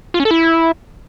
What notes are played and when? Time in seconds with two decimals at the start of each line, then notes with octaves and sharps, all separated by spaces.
0.14 F4
0.20 C#4
0.25 A4
0.31 E4